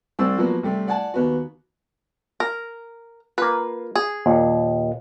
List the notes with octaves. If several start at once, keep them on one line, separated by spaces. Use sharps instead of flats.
C2 G3 C4 E6
F3 F#3 A#3 B3 F#4
C3 G3 A3
D5 F#5 G#5 A5
D#2 B3 F#4
A#4
A#3 F4 B4
G#4
D#2 A#2